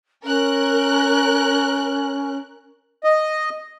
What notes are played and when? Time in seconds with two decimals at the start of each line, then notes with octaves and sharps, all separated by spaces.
0.24 C#4 A#4 F#6
3.04 D#5